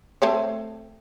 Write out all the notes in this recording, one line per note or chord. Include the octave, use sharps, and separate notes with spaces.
A3 C4 C#5